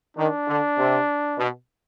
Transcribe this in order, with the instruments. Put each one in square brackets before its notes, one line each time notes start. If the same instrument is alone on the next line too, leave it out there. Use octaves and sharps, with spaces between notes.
[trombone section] D#3 [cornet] D4
[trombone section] D3
C3
B2